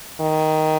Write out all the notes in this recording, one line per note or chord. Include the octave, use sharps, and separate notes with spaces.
D#3